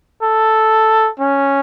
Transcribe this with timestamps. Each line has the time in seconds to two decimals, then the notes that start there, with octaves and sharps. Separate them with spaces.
0.22 A4
1.19 C#4